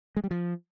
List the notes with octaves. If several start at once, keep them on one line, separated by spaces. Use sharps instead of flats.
G#3
G3
F3